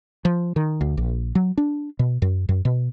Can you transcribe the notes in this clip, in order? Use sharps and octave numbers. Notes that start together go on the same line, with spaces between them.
F3
D#3
D2
A#1
F#3
D4
B2
F#2
F#2
B2